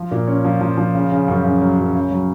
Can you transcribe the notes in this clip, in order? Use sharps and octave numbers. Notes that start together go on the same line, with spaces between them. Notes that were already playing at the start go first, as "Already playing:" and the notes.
Already playing: F3
A#2
C#4
F3
F3
F3
C#3
C#3
F#2
C#3
F#3
F#2
C#3
F#3